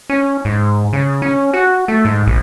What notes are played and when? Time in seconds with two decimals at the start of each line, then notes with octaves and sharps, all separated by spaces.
0.10 C#4
0.45 G#2
0.93 C#3
1.22 C#4
1.53 F#4
1.88 A3
2.05 G#2
2.27 A#1